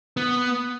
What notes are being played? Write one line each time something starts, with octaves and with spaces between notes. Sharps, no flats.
B3